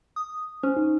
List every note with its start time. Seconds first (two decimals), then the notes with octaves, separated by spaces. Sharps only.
0.16 D#6
0.63 C#4 C5
0.77 D#4